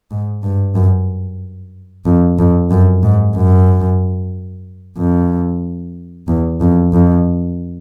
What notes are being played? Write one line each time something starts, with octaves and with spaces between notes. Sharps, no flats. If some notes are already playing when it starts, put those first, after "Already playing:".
G#2
G2
F#2
F2
F2
F#2
G#2
F#2
F2
E2
F2
F2